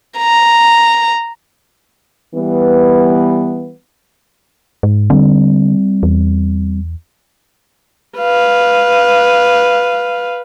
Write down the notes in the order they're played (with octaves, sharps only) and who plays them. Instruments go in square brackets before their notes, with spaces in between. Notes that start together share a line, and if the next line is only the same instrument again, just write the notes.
[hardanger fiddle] A#5
[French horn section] E3 G3 B3
[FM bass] G#2
[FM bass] D3 [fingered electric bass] G3 G#3 C4
[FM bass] E2
[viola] B4 F5